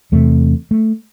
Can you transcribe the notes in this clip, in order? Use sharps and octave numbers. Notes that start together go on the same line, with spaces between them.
E2 C3 A3
A3